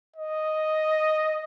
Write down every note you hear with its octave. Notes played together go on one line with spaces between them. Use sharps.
D#5